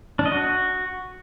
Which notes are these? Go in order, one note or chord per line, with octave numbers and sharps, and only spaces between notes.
D4
D#5
F#4